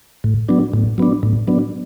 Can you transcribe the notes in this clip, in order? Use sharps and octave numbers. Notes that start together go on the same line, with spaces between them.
A2
F#3 B3 D4
A2
F#3 B3 D4
A2
F#3 B3 D4